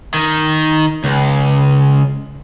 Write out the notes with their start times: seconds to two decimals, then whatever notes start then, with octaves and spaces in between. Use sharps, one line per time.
0.14 D#3
1.04 C#2